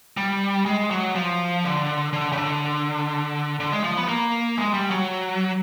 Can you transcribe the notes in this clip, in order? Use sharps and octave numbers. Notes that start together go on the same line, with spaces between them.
G3
G#3
F#3
F3
D3
D3
C#3
D3
D3
G#3
F3
B3
A#3
G#3
G3
F#3